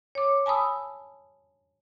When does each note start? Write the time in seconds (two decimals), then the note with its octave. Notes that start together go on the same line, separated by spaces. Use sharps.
0.15 C#5 D6
0.46 G#5 A5 B5 D#6 E6